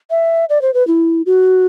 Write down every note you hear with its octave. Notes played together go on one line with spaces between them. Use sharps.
E5
D5
C5
B4
E4
F#4